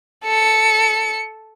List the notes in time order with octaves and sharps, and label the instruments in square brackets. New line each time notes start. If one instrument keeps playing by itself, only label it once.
[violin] A4 C#7